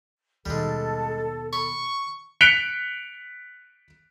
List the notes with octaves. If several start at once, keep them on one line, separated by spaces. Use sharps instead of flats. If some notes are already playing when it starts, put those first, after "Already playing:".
D#2 B2 G3 G#3 A4
B5 C#6
F#6 B6 C#7 D7 F7 G7